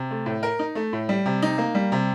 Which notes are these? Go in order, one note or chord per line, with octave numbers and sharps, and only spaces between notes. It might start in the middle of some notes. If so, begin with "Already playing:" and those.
Already playing: C3
A3
A2
A#4
D#4
A3
A2
G3
C3
D#4
A#3
G3
C3